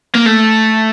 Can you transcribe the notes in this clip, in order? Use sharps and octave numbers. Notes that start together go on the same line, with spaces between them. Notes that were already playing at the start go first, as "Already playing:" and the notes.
A#3
A3